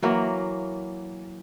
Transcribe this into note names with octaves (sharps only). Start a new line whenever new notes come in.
E3 F#3 A#3